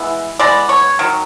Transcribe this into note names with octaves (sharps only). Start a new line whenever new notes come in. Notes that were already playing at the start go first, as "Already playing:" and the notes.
Already playing: E3 G#3 B3
E3 G#3 B3 D5
C#5
D#3 F#3